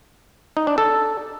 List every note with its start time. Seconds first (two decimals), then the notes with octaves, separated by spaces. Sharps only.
0.57 D#4
0.67 D4
0.78 A4